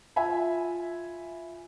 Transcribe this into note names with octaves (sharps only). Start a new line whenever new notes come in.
F4 E5 G#5 B5